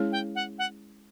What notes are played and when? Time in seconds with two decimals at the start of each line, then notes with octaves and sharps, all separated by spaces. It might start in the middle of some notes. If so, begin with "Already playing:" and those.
Already playing: G#3 C#4 E4 G#4 C#5
0.12 G5
0.35 F#5
0.58 F#5